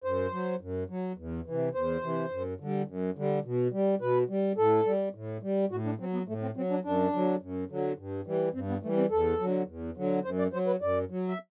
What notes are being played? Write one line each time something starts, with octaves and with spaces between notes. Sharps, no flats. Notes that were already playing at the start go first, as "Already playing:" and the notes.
F#2 C5
F#3
F#2
F#3
E2
C3 E3
E2 C5
C3 E3
F#2
D3 G3
F#2
D3 G3
B2
G3
B2 B4
G3
A2 A4
G3
A2
G3
A2 F#4
D4
F#3 C4
B3
A2 A3
C4
F#3 C4
D4
F#2 D4
D3 F#3
F#2
D3 F#3
G2
E3 G3
G2 C4
B3
E3 G3 A3
C4
E2 A4
D3 F#3
E2
D3 F#3
F#2 C5
D5
F#3 C5
B4
F#2 D5
F#3
E5